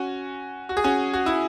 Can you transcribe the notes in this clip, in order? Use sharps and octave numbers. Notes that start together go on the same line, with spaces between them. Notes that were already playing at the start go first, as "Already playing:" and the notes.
Already playing: C#4 F#4
F#4
G#4
C#4 F#4
F#4
E4